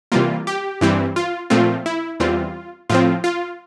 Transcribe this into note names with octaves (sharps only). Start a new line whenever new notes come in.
C3 E3 G3 A#3 F4
G4
G2 E3 G3 C4
F4
A#2 F3 A3 C4 F4
E4
E2 E3 G3 C4 F4
A2 F3 C4 F4
F4